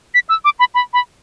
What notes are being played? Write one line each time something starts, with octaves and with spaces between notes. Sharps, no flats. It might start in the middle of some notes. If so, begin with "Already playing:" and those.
B6
E6
D6
B5
B5
B5